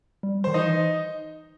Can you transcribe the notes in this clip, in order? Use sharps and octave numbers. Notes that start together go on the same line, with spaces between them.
G3
D#3 C5
E3 D#4 D#5